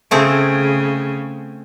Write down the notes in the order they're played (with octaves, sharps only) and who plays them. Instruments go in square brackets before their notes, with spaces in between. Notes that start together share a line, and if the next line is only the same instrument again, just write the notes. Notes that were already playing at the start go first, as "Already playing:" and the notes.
[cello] C#3 [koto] A3 C4 G#4